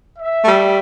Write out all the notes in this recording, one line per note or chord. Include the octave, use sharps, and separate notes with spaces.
E5
A3
G3